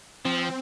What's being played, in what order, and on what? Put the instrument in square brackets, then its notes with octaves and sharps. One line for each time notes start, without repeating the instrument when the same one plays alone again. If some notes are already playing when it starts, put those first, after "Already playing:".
[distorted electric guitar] F3 [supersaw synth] C4